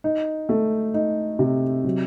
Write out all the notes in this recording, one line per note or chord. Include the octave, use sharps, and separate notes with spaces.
D#4
A3
D#4
C3
F#3